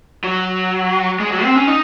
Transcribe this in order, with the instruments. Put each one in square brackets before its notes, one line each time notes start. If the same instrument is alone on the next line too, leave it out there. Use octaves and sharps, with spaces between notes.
[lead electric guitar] F#3
G#3
F#3
C4
C#4
D#4